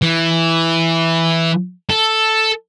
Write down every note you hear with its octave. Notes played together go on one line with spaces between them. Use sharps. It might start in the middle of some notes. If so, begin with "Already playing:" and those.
E3
A4